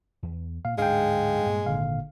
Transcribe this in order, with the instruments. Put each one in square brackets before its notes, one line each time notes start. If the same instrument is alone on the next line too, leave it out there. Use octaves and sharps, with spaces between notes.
[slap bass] E2
[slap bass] A#2 [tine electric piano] F5
[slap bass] D1 G#2 D4 [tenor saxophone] G#3 [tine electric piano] F5 G5
[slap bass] G2 A#2 A#3
[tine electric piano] G#1 D3 F5 [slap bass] A#2